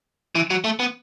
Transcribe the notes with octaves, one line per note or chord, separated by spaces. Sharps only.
E3
F#3
A3
B3